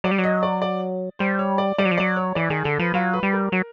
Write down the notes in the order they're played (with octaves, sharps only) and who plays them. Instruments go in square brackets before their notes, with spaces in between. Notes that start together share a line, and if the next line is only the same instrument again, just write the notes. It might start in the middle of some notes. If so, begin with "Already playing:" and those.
[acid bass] F#3 [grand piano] D5
[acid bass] G3
F#3
[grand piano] D#5
D5
D5
[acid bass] G3 [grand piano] C5
[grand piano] C#5
D5
[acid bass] G3 [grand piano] D5
[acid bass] F#3
F3
[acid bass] F#3 [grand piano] D5
[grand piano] C#5
[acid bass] E3 [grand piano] D5
[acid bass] D#3 [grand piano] G#4
[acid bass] D3 [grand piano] A4
[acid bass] F3 [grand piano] B4
[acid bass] F#3 [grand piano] F4
[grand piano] B4
[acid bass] G3
[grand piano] A#4
[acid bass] F#3